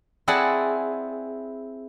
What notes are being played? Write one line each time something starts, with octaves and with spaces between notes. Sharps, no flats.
C4 E4 G#4 D5 F#5 A5